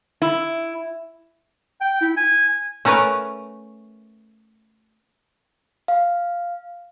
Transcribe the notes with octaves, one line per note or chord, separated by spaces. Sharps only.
E4
G5
E4
G#5
A3 C#4 A#4 B4
F5